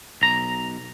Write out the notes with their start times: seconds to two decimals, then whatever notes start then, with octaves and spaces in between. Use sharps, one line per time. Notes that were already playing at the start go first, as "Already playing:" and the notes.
0.22 B1 A#5